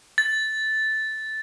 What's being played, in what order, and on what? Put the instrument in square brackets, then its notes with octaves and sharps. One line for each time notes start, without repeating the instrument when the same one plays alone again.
[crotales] A6